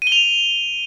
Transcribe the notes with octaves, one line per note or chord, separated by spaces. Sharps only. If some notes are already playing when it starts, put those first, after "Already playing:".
D#7
G7
F7